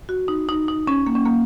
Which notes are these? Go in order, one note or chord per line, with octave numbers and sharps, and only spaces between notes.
F#4
D#4
D#4
D#4
C#4
A#3
C#4
A#3